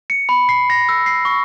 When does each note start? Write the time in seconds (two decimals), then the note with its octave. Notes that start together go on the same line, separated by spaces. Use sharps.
0.10 C#7
0.29 B5
0.49 C7
0.70 A#6
0.89 E6
1.06 C7
1.25 C#6